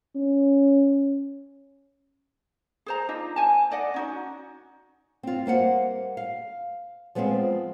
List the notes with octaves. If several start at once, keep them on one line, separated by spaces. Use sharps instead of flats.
C#4
G#4 C5 A#5
D4 D#4 F4 D#5
C5 G#5 A5
D#4 D5 D#5 F#5
C#4 D#4 F#4
C4 F4
G3 A#3 C5 F#5
F5
F3 G#3 B3 C4 F4 C5